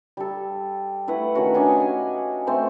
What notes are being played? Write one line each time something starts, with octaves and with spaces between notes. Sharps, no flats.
G3 A4
A3 E4 B4 F#5
D#3 C#4 F#4
C#4 D4 D#5 G#5
G#5
A3 C4 C5 C6